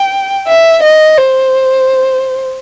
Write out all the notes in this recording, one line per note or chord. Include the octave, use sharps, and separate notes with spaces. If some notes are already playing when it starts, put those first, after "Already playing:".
Already playing: G5
E5
D#5
C5